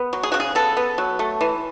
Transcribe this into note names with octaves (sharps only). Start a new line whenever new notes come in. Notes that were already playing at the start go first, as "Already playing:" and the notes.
Already playing: B3
F#3
G#4
C#3 F#4
G#4
B3 A4
B3
F#3
A3
E3